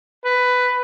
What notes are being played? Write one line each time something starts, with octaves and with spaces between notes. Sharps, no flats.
B4